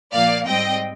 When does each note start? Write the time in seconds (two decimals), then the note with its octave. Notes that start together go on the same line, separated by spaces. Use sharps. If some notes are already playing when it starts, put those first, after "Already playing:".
0.13 A#2 F3 A#3 D5 F5
0.47 G#2 G3 C4 D#5 G5